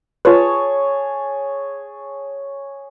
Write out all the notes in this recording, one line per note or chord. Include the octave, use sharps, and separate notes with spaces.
F4 G#4 B4 C#5 A5